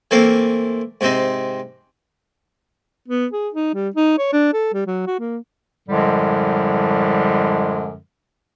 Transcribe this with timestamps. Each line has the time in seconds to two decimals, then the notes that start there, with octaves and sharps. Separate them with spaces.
0.11 E3 A3 A#3 C4 F5
1.01 G#2 C3 C4 D#4
3.08 B3
3.33 G#4
3.54 D#4
3.74 G3
3.96 D#4
4.18 C#5
4.33 D4
4.53 A4
4.73 G3
4.86 F#3
5.07 F#4
5.19 A#3
5.88 F#2 A2 D3 F3 G3 G#3